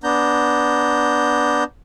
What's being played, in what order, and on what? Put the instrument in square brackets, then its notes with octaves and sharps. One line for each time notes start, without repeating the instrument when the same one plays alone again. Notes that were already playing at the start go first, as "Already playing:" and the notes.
[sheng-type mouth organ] B3 D4 A#5 G6